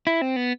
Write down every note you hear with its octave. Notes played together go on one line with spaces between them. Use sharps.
E4
C4
B3